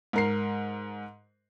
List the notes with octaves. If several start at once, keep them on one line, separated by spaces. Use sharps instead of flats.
G#2 A#4 C7